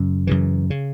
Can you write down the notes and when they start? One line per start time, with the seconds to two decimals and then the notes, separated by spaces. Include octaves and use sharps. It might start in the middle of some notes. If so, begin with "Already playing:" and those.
Already playing: F#2 C#3
0.27 F#2 C#3 E3
0.70 C#3